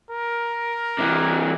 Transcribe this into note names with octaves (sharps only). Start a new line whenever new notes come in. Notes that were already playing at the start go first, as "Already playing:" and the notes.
A#4
C3 E3